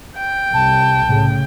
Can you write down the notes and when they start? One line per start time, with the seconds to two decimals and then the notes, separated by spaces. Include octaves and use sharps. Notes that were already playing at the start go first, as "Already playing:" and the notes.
0.17 G5
0.54 C2 A5
1.08 C2 A2 C#3